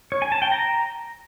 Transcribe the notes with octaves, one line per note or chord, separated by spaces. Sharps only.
C#5
G#5
A5
G5
A#5